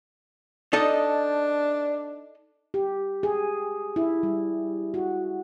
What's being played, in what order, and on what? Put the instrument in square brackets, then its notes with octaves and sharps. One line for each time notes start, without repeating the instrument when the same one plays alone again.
[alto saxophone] D4 [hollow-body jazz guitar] D#4 A4 D#5
[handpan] G4
G#4
E4
G3
F#4